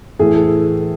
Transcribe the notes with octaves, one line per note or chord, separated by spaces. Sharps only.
A2 E3 G#4
A4